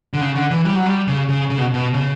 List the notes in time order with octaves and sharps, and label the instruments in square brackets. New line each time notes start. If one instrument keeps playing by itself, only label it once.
[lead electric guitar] D3
C#3
D3
E3
G3
F#3
G3
C#3
C#3
C#3
B2
B2
C#3